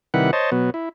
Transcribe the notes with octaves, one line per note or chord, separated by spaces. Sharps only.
C3 D#3 G3 E4 B4 F#5
C5 C#5 D#5 A5
B2 F#3 B3
E4